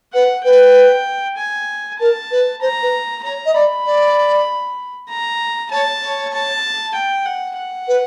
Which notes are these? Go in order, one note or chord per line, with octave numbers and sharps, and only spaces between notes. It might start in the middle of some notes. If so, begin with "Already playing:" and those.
B4 F#5
B4 G5
G#5
A#4 A5
B4
C5 A#5
B4
C#5 A#5
D#5
D5 B5
D5
A#5
C#5 A5
C#5
A5
G5
F#5
F#5
B4